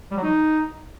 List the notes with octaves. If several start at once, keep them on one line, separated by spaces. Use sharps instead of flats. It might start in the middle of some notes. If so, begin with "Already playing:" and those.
G3
F#3
D#4